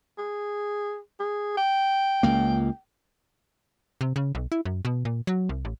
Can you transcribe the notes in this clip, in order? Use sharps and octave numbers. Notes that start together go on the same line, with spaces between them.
G#4
G#4
G5
C#2 A#3
C3
C#3
B1
E4
F#2
B2
A#2
F#3
C2
A1